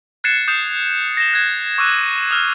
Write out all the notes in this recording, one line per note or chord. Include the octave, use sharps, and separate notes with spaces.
F#6 G#6 A6 C7 C#7 E7
D#6 G6 C7 E7
A#6 C#7 E7 G7
F#6 G#6 E7
C#6 D6 E6 F#6 D#7
D#6 F6